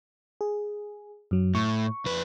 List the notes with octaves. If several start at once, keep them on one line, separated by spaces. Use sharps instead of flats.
G#4
F#2 F#3
A2 C#6
F2 B4